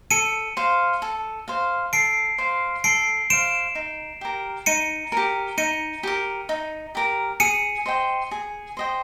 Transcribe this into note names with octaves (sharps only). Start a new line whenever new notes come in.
A4 C#7 D#7
C5 F5
A4
C5 F5
A4 C7 D7
C5 F5
A4 C7 D7
C5 F5 D7 E7
D#4
G4 A#4
D#4 C#7 D#7
G4 A#4
D#4 C#7 D#7
G4 A#4
D#4
G4 A#4
G#4 C#7 D#7
C5 D#5 G5
G#4
C5 D#5 G5